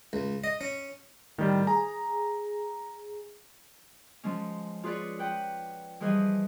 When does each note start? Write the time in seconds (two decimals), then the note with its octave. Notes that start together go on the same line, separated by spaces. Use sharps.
0.13 C#2
0.44 D#5
0.61 C#4
1.38 A2 D#3 G3
1.67 G#4 A#5
4.24 F3 G#3 C#4
4.84 F4 G#4 B4 C#5 D5
5.19 B4 F#5 G5
6.00 E3 F3 G3 G#4 B4 D#5